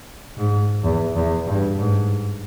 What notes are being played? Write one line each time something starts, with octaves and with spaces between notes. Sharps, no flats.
G#2
E2
E2
G2
G#2